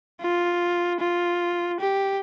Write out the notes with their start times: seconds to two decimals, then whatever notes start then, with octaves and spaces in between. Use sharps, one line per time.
0.21 F4
1.00 F4
1.80 G4